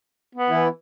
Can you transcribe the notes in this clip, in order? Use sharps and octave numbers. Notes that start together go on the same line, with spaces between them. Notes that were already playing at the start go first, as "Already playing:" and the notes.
B3
E3 E4